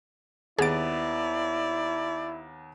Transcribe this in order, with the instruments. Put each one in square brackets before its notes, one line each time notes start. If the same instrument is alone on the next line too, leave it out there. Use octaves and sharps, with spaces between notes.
[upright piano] D#2 B3 A6 [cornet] E4 [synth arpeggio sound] G#4 D7 [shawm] D5